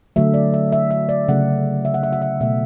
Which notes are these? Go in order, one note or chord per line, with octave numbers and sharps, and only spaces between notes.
D3 F#3 A3 E5
D5
E5
E5
E5
D5
C#3 F#3 A3 F#5
E5
F#5
E5
F#5
E5
B2 A3 E5